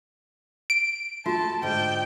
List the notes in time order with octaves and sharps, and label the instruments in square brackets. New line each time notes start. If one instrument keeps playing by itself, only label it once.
[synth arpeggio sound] D7
[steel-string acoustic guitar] A3 A4 [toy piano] F4 F#4 [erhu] A5
[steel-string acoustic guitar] G#2 D3 [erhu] G5